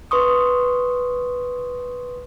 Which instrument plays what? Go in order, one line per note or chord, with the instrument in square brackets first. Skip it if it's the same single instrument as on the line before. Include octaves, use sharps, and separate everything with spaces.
[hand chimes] B4 C6 C#6 D#6